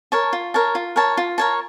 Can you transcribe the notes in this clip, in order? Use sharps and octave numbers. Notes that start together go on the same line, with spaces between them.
A#4 C#5 A5
F4
A#4 C#5 A5
F4
A#4 C#5 A5
F4
A#4 C#5 A5